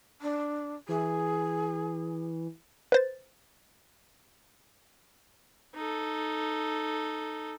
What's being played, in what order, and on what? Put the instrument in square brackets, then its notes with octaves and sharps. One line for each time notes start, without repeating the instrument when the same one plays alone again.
[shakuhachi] D4
[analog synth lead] E3 [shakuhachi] G#4
[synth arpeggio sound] B4 C5 A6
[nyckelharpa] D#4 A4